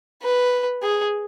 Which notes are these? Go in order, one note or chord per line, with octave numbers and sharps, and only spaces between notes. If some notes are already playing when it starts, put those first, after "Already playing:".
B4
G#4